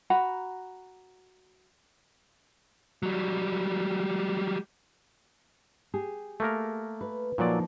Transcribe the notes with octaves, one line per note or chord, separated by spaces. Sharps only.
F#4 F#5 A#5 B5
F#3 G3
G4 G#4
A3 A#3 A#4
B4
A#2 F3 F#3 A#3 D#4 D5